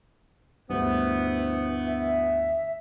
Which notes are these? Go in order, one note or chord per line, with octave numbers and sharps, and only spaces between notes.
D2 G2 E3 A3 B3 C5
E5